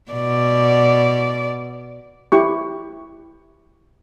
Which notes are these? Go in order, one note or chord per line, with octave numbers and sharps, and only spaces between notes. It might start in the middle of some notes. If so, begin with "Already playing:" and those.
B2 D5
E4 G4 C#6